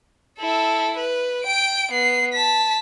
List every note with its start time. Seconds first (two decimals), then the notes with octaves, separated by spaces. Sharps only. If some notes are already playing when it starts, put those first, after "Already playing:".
0.39 E4 A4
0.97 B4
1.45 G5 D7
1.91 B3 C7
2.33 A5 B6